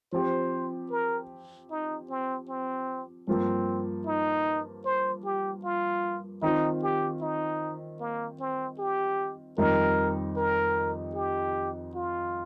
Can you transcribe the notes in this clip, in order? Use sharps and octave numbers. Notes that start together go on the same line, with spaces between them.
F3 C4 G4 C5
A#4
D#4
C4
C4
G2 F3 A#3 C4
D#4
C5
G4
F4
D#3 C4 D#4 F4
G4
D#4
A#3
C4
G4
F2 D#3 G3 D#4 A#4
A#4
G4
F4